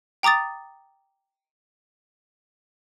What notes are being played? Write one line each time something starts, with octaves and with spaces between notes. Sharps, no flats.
G5 A#5 D6 D#6 A6